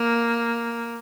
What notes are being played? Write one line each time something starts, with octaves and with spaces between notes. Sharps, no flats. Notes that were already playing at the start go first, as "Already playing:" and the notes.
Already playing: A#3